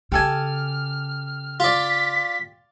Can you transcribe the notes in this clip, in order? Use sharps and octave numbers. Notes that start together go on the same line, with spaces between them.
C#3 G4 A4 G#5 F6
F4 D5 B6